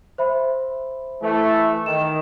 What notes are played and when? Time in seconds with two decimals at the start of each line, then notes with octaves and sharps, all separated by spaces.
0.18 C5 E5 B5
1.22 E3 A3
1.86 D#3 E7